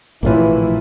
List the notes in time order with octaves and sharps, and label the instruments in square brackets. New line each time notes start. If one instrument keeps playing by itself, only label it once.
[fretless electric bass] A#1 A2 C3 [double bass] E3 E4 [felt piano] A#3 F4 B4